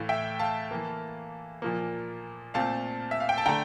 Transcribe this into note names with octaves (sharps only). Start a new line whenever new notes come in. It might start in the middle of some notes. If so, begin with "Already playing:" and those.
Already playing: A2 E3 A3 F5
E5 G5
F5 A5
E3 A#3
A#2 F3 A#3
A#2 A3 C4 F5 A5
E5
F5
G5
A5
D3 A3 G5 A#5